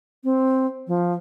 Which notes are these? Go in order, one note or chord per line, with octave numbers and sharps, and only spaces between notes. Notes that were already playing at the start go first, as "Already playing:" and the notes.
C4
F3